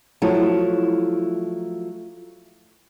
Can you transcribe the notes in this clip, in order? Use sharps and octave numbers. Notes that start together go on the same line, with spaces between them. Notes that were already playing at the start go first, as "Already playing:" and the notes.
F3 F#3 A3 E4